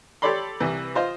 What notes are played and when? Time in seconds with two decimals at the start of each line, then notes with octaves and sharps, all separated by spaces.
0.22 G4 A4 C#5 D5 B5 C6
0.60 C2 E3
0.95 F4 C5 D#5